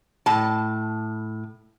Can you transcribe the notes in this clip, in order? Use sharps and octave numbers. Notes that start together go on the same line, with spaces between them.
A2 A5